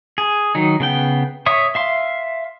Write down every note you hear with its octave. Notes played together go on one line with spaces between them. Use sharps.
G#4
D#3 F#3 D#4
C#3 B3 G5
C#5 E5 C#6 D#6
E5 F5 C6